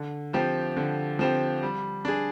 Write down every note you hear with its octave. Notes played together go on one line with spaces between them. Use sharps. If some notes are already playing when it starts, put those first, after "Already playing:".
Already playing: D3
F3 C4 G4
D3
F3 C4 G4
G3
D4 G#4